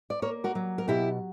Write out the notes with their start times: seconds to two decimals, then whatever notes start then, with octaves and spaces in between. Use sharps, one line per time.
0.10 D5
0.22 A#3 A#4 C#5
0.44 F#4 A#4
0.55 F#3
0.78 A#4
0.88 B2 E4 G4